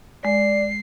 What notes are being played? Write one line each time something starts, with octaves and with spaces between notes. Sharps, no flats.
G#3 D5 C7